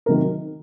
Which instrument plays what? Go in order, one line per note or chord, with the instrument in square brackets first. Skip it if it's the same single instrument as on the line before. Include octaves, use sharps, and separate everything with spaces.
[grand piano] C3 D#3 F#3 A#4